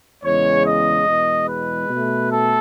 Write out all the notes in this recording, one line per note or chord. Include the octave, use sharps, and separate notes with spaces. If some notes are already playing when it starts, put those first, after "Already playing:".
E2 C#3 G#3 C#5
D#5
E2 B2 G#3
B4
B2 A3
A4